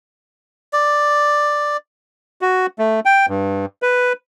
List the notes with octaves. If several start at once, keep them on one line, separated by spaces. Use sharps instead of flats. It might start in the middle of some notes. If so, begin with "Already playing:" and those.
D5
F#4
A3
G5
G2
B4